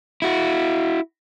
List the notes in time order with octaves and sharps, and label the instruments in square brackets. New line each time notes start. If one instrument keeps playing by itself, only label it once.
[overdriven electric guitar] E4 F#4